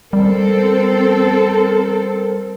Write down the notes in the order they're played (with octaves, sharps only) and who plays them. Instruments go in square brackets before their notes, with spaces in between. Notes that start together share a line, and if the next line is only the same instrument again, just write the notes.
[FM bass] G3 [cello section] C4 A4 [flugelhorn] A#4